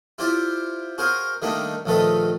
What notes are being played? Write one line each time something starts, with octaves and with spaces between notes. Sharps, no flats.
E4 F4 G4 C5 D5
F#4 G#4 A#4 C5 F5
D#3 G3 A3 A#3 D4 D#4
A#1 D#3 A3 A4 B4 D#5